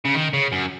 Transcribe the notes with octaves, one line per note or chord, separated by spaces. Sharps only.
C#3
D#3
C#3
F#2